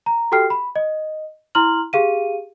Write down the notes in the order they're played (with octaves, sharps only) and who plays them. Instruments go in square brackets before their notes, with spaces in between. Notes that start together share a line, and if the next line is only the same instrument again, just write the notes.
[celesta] A#5
F#4 G4 A4 G5 F6 C7
B5
D#5
E4 A#5 C6 F6 F#7
G4 G#4 F5 D#7